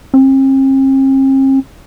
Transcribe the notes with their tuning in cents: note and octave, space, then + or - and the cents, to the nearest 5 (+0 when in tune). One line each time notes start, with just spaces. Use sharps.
C4 +45